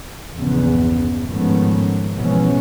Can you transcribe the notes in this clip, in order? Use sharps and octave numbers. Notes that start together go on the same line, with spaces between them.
A#1 E2 G2 C#3 B3
G#2 D#3 F3 A3 B3 C#4
B2 E3 F3 G#3 B3 C#4